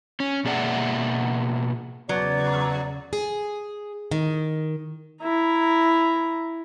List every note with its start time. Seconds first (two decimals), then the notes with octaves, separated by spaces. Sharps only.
0.20 C#4
0.45 B2 A#3 G#4 D5 E5 F#5
2.09 E2 C#3 F#3 B3 D5
3.13 G#4
4.11 D#3
5.23 E4 A#5